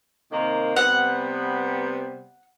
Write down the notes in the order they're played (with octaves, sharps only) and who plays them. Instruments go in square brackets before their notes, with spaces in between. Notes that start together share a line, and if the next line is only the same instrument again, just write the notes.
[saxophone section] C3 D#3 A#3
[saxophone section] C3 G3 B3 [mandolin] F#5